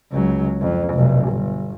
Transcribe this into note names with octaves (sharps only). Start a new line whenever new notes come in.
C#2 F#3
F2
F1 B1
G1